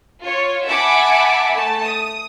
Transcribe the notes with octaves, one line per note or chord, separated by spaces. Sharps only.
F4 C#5
E5 F#5 G#5 A5 B5 D6
A3 A5
D#6